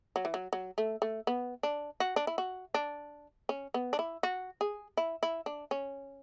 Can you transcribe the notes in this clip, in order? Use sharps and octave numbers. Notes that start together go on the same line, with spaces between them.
F#3
E3
F#3
F#3
A3
A3
B3
D4
F#4
D4
E4
F#4
D4
C#4
B3
D4
E4
F#4
G#4
E4
E4
D4
C#4